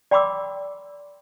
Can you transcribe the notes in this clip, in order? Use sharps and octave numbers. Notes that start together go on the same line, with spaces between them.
D5 G5 B5 C6 D6 E6